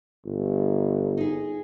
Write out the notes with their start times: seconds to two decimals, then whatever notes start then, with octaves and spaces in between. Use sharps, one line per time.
0.25 G1
1.17 D#4 G#4